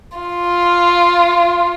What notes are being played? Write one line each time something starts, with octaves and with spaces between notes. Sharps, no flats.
F4